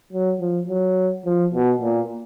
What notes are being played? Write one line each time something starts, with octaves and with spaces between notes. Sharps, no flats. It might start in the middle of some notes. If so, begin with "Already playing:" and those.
F#3
F3
F#3
F3
B2
A#2